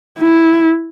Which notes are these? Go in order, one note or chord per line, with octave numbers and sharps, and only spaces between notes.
E4